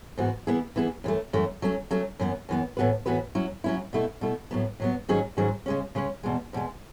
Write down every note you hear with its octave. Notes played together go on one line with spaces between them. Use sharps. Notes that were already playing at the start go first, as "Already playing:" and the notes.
G#2 E3 B3 F#4
E3 B3 E4 G#4
E3 B3 E4 G#4
F#2 E3 A3
F#2 E3 A3
F#3 A3 C#4
F#3 A3 C#4
F#2 E3 B3
F#2 E3 B3
A2 E3 B3 F#4 B4
A2 E3 B3 F#4 B4
F#3 C#4 E4
F#3 C#4 E4
B2 A3 E4
B2 A3 E4
A2 F#3 B3
A2 F#3 B3
G#2 D#3 F#3 C#4 G#4
G#2 D#3 F#3 C#4 G#4
C#3 G#3 C#4
C#3 G#3 C#4
E2 B2 G#3
E2 B2 G#3